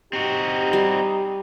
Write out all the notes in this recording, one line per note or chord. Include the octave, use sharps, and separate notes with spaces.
C4 D#4 F#4 G4
G3 C6